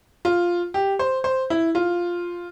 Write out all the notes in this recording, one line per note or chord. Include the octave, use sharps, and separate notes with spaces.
F4
G4
C5
C5
E4
F4